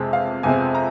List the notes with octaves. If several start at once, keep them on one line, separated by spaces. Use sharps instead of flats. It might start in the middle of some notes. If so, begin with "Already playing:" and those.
Already playing: F2 C3 G#3 C4
F5
F2 C3 G#3 C4 G#5
A#5